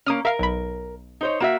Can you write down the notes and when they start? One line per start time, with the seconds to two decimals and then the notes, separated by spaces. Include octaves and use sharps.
0.06 A#3 C#4 D#6 F6
0.25 A#4 E5 F5 C7
0.39 B1 B5
1.21 D#4 C5 C#5
1.40 A#3 F#4 E5 E7